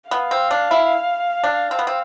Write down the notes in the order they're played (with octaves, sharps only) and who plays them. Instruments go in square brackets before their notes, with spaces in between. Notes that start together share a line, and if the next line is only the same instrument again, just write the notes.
[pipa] B3 [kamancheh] F5
[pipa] C4
D4
E4
D4
C4
B3
C4